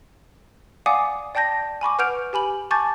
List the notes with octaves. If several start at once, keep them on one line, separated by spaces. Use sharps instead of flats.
D5 F5 F#5 G#5 D6 D#6
D5 G5 A5 G6 A#6
G#5 B5 C#6 D6
B4 F#5 F6 G6 D7 F7
G4 G#5 B5 F#7
G#5 A5 C#6 D6 G6 A6